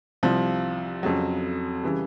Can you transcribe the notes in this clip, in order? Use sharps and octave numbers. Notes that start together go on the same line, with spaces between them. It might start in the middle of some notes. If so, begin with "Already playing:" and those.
C2 C3 F3
F2 C#3 F#3
C#3 E3 G3